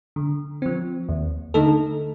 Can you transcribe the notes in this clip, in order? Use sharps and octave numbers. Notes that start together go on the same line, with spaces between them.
D3
F3 C4
D#2
D3 A3 D#4 A4